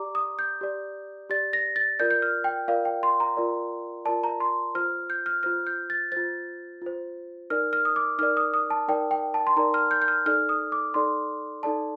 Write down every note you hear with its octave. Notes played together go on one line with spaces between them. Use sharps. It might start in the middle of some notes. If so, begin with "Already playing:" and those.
Already playing: G4 D5 A#5 D6
D#6
G6
G4 D5
G4 D5 A6
A#6
A6
F4 A#4 D5 G6
G6
F6
G5
F4 A#4 D5 F5
G5
C6
A#5
F4 A#4 D5
F4 A#4 D5 A5
A#5
C6
F4 C5 F6
G6
F6
F4 C5 F6
G6
A6
F4 C5 A6
F4 C5
D#4 A#4 D5 F6
F6
D#6
D6
D#4 A#4 D5 F6
D#6
D#6
A5
D#4 A#4 D5 G5
G5
A5
C6
D#4 A#4 D5 A#5
F6
G6
G6
F6
D#4 A4 D5 F6
D#6
D6
D#4 A4 D5 C6
D#4 A4 D5 A5